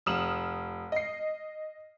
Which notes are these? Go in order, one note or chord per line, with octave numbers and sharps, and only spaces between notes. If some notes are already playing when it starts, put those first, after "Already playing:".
F1 D#6 F6 E7 F#7
D#5 C7